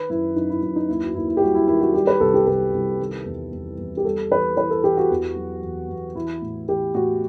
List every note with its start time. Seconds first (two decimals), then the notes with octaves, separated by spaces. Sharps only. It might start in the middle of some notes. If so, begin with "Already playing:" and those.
Already playing: D#3 B4
0.10 F#2 E4
0.36 F#2 D#4
0.50 E4
0.62 F#2 E4
0.76 D#4
0.88 D#2 E4
1.02 F#4
1.15 D#2 E4
1.28 E4
1.37 G4
1.41 G3 F#4
1.54 E4
1.68 D#3 E4
1.81 F#4
1.94 G3 G4
2.07 B4
2.20 C2 A4
2.34 G4
2.46 C2 A4
2.73 C2
3.00 D#3
3.25 E2
3.52 E2
3.78 E2
3.97 G4
4.04 G3 A4
4.31 E3 B4
4.57 E3 B4
4.70 A4
4.83 E3 G4
4.97 F#4
5.10 E2
5.36 F#3
5.63 E2
5.89 E2
6.15 E3 E4
6.42 A2
6.68 E3 G4
6.94 A2 F#4